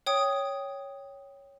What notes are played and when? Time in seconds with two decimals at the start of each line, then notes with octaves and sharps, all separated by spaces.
0.06 C#5 G5 D#6